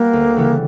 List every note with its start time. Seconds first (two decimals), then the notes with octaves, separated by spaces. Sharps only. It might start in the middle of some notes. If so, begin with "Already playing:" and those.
Already playing: G3 A#3 B3
0.13 D2
0.36 C#3 E3 G3 B3